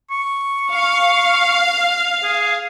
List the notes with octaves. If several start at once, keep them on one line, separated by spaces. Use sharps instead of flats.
C#6
F5
G#4